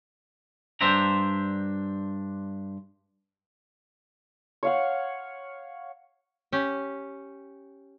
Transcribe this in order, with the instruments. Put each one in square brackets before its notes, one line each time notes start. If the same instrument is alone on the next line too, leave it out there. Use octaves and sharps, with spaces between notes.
[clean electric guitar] G2 D4 C5 E5 G5 A#5
[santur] C#5 F5 F#5
[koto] C#4 G4